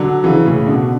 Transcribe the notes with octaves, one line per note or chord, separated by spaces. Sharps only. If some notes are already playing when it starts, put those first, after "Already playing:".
Already playing: D3 F#3
C#3 E3
A2 C#3
B2 D3